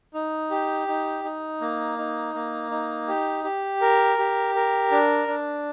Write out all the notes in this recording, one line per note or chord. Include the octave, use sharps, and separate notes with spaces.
D#4
G4
D#4
D#4
A#3
D#4
A#3
D#4
G4
G4
A#4
G4
A#4
D4
D4